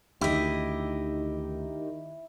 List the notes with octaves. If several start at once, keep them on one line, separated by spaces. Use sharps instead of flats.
D2 D#3 E4 G4 D#5